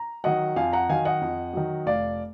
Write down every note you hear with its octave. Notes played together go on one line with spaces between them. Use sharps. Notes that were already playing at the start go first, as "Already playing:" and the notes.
Already playing: A#5
D#3 F#3 D#5 F#5
F2 F5 G#5
F#5 A#5
D#3 F#3 F5 G#5
D#5 F#5
F2
D#3 F#3
F1 D5 F5